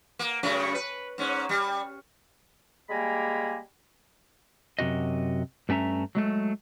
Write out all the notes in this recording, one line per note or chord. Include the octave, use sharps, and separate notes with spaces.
A#3
F#2 C#3 A3
B4
G#2 C#4
G3
G3 G#3 A#3 G#5 A#5 B5
F#2 C3 F#4 D#5
G2 A3 C#4 E5 A#5
F#3 G#3 A3